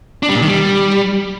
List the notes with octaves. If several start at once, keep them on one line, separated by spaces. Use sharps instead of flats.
D4
G3
A#2
D#3
G3